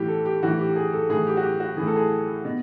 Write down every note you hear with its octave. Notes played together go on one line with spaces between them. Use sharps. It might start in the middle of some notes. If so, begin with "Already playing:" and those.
Already playing: A2 E3 F#4 G4
A4
G4
A2 E3 F#4
G4
G4
G#4
A4
A2 E3 G#4
G4
F#4
G4
F#4
A2 E3 G#4
A4
G#4
B2